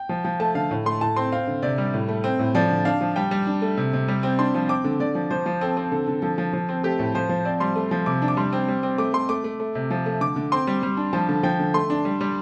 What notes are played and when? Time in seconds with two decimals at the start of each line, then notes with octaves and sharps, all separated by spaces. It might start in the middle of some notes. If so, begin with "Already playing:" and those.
Already playing: G5
0.09 F3
0.25 F3
0.40 A3 A5
0.55 D3 F5
0.71 A2
0.86 A3 C6
1.01 A2 A5
1.16 C4 C6
1.32 C4 F5
1.47 D3
1.63 C3 D5
1.78 G3
1.94 A2
2.09 A3
2.24 C4
2.39 A2
2.55 F3 D5
2.70 D3
2.85 D4 F5
3.01 F3
3.16 G3 G5
3.31 G3
3.47 D4
3.62 A3
3.77 C3
3.93 C3
4.08 G3
4.23 C4
4.38 D4 C6
4.54 F3
4.69 C4 D6
4.84 D3
5.00 D3 D5
5.15 F3
5.31 F3 C5
5.46 F3
5.61 C4 A4
5.77 C4
5.91 D3 A4
6.08 D3
6.22 F3 A4
6.38 F3
6.53 F3
6.69 C4
6.84 A3 G4
6.99 A2 A4
7.14 F3 C5
7.29 F3
7.45 C4 D5
7.60 G3 C6
7.76 A3
7.91 F3
8.06 C3 D6
8.22 D4
8.28 D6
8.37 G3 C6
8.53 C4
8.68 G3
8.83 C4
8.98 A3 D6
9.14 A3 C6
9.29 A3 D6
9.44 A3
9.60 A3
9.75 C3
9.91 F3
10.06 A3
10.21 D3 D6
10.36 D3
10.52 C4 C6
10.67 G3
10.83 G3
10.97 D4
11.13 F3 A5
11.29 D3
11.43 F3 G5
11.59 D3
11.74 A3 C6
11.90 D4
12.05 G3
12.21 G3